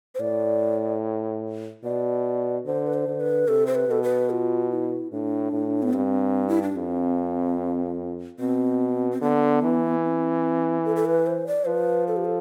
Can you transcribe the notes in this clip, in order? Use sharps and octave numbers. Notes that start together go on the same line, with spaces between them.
C5
A2 D5
B2 D5
D3 C5
B4
C5
D3
B4
C3 A4
C5
B4
B2 A4
B4
F4
E4
A2 D4
A2
B3
G2 C4
E4
D4
F2 C4
B2 C4
C4
D3 B3
E3
C4
A4
A4
B4
C5
D5
F3 B4
A4
G4
A4